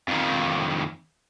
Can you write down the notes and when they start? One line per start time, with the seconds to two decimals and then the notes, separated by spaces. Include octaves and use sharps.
0.08 F2 D#3